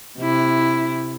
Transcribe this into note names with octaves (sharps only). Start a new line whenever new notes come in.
C3 E4